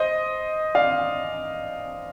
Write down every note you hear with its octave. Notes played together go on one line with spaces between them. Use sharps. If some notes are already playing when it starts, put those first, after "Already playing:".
Already playing: C5 D#5
D5 F5